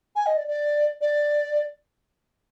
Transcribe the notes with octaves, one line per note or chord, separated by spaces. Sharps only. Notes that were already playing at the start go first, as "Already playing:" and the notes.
G#5
D#5
D5
D5
D5